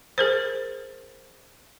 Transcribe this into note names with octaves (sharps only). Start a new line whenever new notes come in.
G#4 A#4 C5